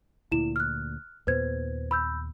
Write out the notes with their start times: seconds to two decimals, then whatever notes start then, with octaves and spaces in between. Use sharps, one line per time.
0.32 D2 A#2 E4 E7
0.56 F6 F#6
1.27 D#2 A#2 B3 B4 C5 G#6
1.91 B5 E6 G6